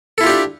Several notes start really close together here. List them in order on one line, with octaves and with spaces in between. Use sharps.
A4 E4 F4 G4 D4